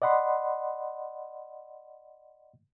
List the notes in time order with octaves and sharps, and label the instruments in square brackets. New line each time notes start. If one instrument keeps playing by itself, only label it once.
[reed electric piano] D5 D#5 F#5 B5 C6